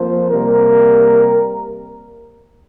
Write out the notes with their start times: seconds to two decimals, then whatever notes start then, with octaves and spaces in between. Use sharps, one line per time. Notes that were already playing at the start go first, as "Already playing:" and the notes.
Already playing: F2 F3 A#3 C5
0.30 C3 G3 A#3 A#4